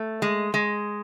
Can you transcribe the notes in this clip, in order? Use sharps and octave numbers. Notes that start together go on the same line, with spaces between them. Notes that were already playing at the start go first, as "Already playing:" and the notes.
Already playing: A3
G#3
G#3